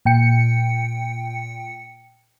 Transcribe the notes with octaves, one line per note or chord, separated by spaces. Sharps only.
A#2 G5 C#7